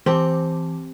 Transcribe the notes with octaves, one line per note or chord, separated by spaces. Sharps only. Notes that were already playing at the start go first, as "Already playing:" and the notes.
E3 C4 G4 A5